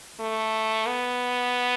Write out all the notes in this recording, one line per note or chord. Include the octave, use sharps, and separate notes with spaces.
A3
B3